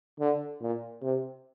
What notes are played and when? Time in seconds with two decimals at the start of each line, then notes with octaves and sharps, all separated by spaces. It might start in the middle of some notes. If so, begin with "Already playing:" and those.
0.20 D3
0.61 A#2
1.02 C3